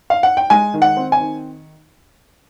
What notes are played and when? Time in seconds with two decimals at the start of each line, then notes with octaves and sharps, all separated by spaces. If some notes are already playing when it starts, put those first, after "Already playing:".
0.10 F5
0.23 F#5
0.37 G5
0.50 G#3 G#5
0.74 D#3
0.82 F#5
0.97 C4
1.12 G#5
1.20 D#3